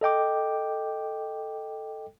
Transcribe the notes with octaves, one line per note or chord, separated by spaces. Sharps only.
A4 D#5 G5 D6